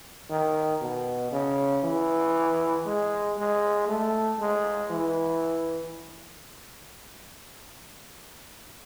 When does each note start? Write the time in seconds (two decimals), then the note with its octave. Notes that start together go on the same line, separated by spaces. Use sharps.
0.30 D#3
0.81 B2
1.32 C#3
1.84 E3
2.86 G#3
3.37 G#3
3.88 A3
4.39 G#3
4.91 E3